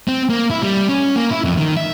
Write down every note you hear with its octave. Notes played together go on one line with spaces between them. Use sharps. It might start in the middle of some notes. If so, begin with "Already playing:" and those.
C4
A#3
E4
G3
C#4
A#3
E4
F2
D#3
E5